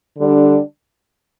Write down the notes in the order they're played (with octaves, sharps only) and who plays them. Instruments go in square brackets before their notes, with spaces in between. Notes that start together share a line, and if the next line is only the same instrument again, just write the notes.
[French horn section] D3 G3 D4